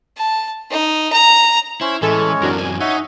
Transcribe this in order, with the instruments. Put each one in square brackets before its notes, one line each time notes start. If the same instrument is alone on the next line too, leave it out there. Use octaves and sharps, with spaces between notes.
[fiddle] A5
D#4
A#5
[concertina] C#4 C5 [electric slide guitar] E4
[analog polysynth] A1 A4 E5 [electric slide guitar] E3 [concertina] G#3 C#4 C#5
[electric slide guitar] F#2 E3 C4 [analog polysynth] D4 F#4 A#4
[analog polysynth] G#5
[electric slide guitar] D#4 [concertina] C#5 E5 F#5